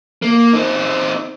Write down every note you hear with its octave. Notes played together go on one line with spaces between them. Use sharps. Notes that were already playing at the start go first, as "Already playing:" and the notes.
A#3
C4 D#4